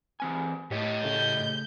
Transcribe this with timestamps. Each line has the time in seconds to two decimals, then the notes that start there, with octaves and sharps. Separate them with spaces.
0.20 E3 C4 G#5
0.71 A2 G4 C#5 D#5
1.03 C#3 A3 G6